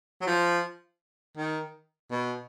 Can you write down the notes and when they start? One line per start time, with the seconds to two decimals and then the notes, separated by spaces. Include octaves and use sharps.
0.21 F#3
0.27 F3
1.37 D#3
2.11 B2